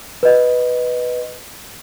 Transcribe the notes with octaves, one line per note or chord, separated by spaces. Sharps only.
B4 D#5